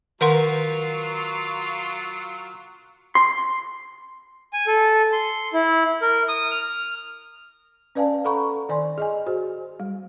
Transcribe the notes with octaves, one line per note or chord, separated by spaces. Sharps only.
D#3 F#3 F4 A#4 B4 F#5 C6
C6
G#5
A4
C6
E4
A#4
D#6
F6
C#4 B4 D5 F5 G#5 A5
A4 F#5 A#5 B5 C#6
D#3 D5 G#5 C6
G#4 D#5 G#5
F#4 G#4 C5
G3